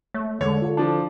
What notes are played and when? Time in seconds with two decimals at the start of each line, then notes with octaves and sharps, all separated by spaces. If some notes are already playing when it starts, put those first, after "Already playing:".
0.14 A3 C#5
0.41 E2 D3 G#3 C#5
0.62 F4 A4
0.77 F3 D4 A5